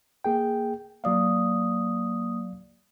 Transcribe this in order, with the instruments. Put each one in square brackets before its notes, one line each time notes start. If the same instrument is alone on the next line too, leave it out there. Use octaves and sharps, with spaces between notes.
[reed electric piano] A#3 G#4 G5
[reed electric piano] F#3 D5 F5 [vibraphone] A#3 D#6